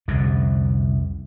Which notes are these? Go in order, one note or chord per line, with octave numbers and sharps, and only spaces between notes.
C2 F2 D3